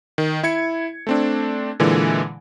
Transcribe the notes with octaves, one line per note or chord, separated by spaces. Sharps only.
D#3
E4 G#6 C#7
A3 C4 D4
A#2 D3 E3 G#3